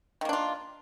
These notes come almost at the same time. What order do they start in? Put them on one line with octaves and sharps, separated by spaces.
D#3 A#3 D4 F4